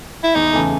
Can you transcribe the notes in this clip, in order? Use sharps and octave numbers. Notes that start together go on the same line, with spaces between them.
E4
E2 D#4
C#3 E3 A3